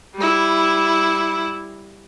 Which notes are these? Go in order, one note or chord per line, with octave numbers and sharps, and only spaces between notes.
G3 E4